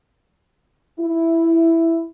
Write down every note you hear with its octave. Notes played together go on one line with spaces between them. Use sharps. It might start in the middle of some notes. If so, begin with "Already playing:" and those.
E4